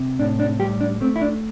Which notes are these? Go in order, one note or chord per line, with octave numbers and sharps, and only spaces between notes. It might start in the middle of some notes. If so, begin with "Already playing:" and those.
Already playing: C3
A2 D4
D4
G3 G4
D4
A3 C4
E4
D4